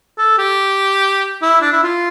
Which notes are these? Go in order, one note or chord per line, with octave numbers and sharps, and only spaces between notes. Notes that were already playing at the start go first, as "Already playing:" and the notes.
A4
G4
E4
D4
E4
F4